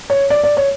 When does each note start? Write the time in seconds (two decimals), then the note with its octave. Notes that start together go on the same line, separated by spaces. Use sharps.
0.10 C#5
0.30 D5
0.43 D5
0.57 C#5